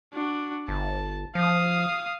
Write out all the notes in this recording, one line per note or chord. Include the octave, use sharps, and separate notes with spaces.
D4 F#4
G1 A5
F3 F5 D#6